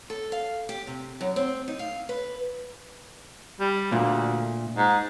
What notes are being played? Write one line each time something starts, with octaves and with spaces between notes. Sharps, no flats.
A4
F5
G4
C3
F#2
C4
D#4
F5
B4
G3
D2 A#2
G#2